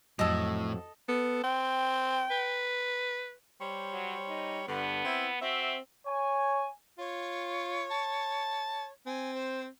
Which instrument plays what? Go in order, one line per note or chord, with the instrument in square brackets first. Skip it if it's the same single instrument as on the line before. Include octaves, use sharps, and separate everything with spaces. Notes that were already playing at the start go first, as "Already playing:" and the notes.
[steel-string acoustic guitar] F2 F#3 [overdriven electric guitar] A2 [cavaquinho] A4 D#5
[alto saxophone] B3 [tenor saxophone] A4
[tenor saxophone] C4 [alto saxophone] G5
[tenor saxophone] B4
[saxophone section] G3 C5 C#5
[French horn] F#3
D#4
[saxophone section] G2 D3 [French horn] B3
[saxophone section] C4 E4
[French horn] C4 [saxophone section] F#4 E5
[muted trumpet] C#5 [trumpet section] G#5
[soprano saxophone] F4 [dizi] C#5
[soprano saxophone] A5
[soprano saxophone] C4 [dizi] G#5
[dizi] C5